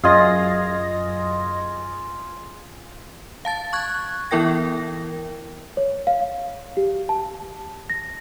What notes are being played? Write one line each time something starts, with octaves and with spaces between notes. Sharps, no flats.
F#2 F4 G#4 D#5 F5 A#6
F5 A5 A6
C#6 F#6 G#6
E3 B3 E4 A#4 G5 A#6
C#5
F5
G4
A5
A#6